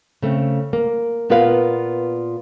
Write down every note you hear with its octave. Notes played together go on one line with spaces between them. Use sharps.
C#3 A3 C4
A#3
A#2 B3 F4 A#4 B4 F5